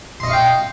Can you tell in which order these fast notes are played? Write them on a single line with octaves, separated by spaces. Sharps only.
C6 D#5 C#6 F5 G5